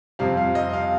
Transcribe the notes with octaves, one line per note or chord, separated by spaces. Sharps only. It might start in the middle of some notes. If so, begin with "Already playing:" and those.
F2 C3 G3 F5
F5
D#5
F5